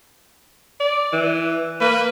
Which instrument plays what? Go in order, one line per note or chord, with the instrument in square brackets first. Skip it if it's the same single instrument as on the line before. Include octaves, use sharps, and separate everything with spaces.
[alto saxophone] D5
E3
[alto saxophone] A#3 [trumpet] B4